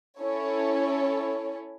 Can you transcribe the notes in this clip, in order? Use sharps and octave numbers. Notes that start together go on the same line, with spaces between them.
C#4 E4 A4 C#5